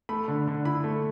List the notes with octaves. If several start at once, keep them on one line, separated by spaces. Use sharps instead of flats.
A3 B5
D3
D3
E4 B5
A3